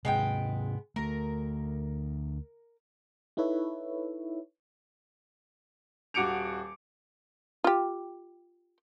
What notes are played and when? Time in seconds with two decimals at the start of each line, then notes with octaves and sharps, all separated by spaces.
0.05 G#2 C3 G#3 B3 G5
0.96 D2 A3 A#4
3.37 D#4 E4 A4 B4 C#5 E5
6.14 D#1 F#4 D6 C#7 D7 F7
7.64 F4 G4